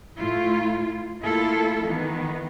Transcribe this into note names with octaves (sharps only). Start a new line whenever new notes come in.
A2 A3 E4 F4
A3 A#3 E4 F4 A4
D#3 E3 B3